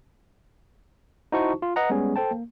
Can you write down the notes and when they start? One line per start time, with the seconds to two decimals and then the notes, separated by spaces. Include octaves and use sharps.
1.32 D#4 E4 F#4 C5 A5 C#6
1.62 F4
1.76 B4 D#5 F#5 A#5
1.90 G3 G#3 B3 C#4 G#4
2.16 A4 C5 G5 A5
2.31 A#3